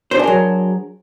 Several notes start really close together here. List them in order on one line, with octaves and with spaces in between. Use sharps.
C5 D4 G#4 A#4 F#3